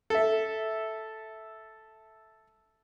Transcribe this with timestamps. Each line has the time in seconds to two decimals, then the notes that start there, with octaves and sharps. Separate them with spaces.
0.10 A4 E5